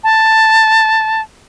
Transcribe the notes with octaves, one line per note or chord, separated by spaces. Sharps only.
A5